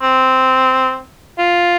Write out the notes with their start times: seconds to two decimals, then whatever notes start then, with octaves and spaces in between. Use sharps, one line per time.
0.02 C4
1.38 F4